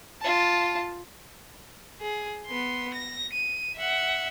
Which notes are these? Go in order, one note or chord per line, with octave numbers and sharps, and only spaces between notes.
F4 A5
G#4
B3 C6
A#6
D#7
E5 F#5